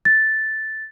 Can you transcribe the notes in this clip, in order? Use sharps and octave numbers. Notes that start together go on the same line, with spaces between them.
A6